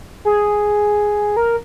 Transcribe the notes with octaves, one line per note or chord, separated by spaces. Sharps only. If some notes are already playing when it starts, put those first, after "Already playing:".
G#4
A#4